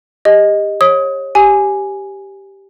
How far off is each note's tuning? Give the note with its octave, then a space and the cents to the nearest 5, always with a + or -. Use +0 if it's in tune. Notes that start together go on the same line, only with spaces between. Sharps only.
G4 +30 D#5 +0
C#5 -30 D#6 +25
G4 +0 G#5 +0